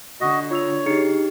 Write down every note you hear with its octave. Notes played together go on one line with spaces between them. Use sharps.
D3 F#4 D#5
F4 C#5 E6 F7
D#4 G4 G#4 A#5 C#7